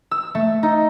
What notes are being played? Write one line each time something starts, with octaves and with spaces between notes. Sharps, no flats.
E6
A3
D#4